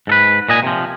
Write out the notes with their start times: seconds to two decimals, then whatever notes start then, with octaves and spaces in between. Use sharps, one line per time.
0.07 G#2 A4 B4
0.49 A#2 D#5 G#5
0.63 C3 F3